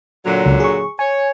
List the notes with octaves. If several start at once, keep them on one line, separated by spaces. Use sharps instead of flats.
A#2 D3 F#3
C#2
G#4 C#6
C#5 G#5